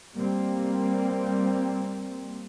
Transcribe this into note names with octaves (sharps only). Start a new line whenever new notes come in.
G3 A#3 C4